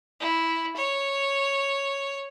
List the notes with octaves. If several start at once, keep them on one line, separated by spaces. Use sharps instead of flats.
E4
C#5